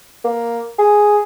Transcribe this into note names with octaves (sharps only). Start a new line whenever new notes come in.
A#3
G#4